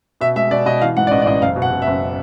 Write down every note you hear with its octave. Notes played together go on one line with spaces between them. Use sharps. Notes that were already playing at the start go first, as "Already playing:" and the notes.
B2 E5
G#3 E5
B2 D5
B2 D#5
E3 F5
G#2 F#5
D5
A1 D#5
D5
A1 D#5
F#1 F5
B2
F#5
B2
E5
F#1